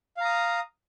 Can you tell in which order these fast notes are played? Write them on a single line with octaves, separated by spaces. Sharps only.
F5 A#5 D#6